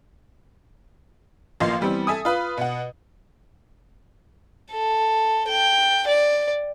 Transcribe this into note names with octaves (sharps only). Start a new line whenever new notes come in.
A1 F3 A#3 D#5 F5 C6
E3 G3 B3 C4
A4 E5 G#5 D#6
F4 B4
B2 F#5
A4
G5
D5